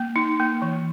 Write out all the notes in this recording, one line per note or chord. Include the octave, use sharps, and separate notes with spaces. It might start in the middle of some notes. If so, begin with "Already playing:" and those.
Already playing: A#3
D#4
A#3
E3